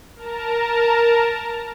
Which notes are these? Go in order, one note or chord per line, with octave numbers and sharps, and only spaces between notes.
A#4 A5 A#5